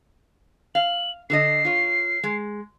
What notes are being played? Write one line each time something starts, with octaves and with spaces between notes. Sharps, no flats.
F5 F#7
D3 A4 D#5 C7
F4 C#5
G#3